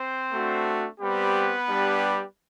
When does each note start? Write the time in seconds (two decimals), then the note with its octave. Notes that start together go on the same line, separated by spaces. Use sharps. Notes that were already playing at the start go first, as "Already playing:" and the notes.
Already playing: C4 C5
0.33 A3 D4 F#4
1.00 G3 B3 C4 G4 B4
1.69 G3 D4 G4